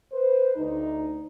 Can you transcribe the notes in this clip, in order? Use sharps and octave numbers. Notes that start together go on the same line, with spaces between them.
B4 C5
D2 D#4